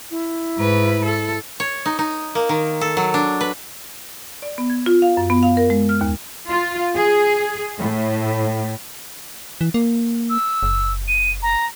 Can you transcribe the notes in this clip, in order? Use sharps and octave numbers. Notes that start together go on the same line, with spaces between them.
E4
G#2 B4
A4
C#5
D#4
D#4
A#3
D#3
A4
F#3
D4
B4
D5
B3
G#6
F4
F5
F#2
B3
F5
A#4
G#3
F6
D#2
F4
G#4
A2
E3
A#3
E6
F#1
D#7
A#5